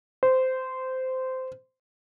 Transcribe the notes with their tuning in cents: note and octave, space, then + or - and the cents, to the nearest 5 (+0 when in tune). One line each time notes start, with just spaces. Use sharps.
C5 -15